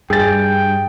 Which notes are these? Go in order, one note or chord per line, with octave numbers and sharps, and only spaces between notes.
G2 G#4 G5 A6